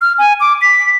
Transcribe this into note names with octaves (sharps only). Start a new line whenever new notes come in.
F6
G#5
D6
B6